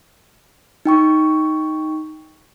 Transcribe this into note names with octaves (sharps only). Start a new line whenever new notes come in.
D#4 G5 C#6